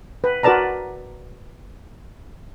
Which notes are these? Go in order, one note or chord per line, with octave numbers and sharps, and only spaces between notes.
B4
F#4 A#4 B4 D5 A5 A#5